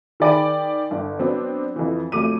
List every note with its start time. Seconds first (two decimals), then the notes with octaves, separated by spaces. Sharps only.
0.20 D#3 G#4 D5 G5 B5 D7
0.91 G1
1.19 F#3 B3 C4 D4
1.76 F2 E3
2.12 F2 F#3 A3 D6 D#7